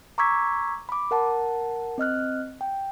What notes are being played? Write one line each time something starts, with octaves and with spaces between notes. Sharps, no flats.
A#5 C#6 D6 E6 G#6 B6
B5 D6
A#4 F#5 A5
C4 D#5 F6 F#6
G5